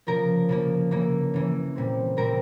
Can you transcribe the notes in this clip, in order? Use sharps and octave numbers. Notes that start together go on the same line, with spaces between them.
C#3 F3 A#3 A#4
C#3 F3 A#3
C#3 E3 A#3
C#3 E3 A#3
A#2 G3 C4
A#2 G3 C4 A#4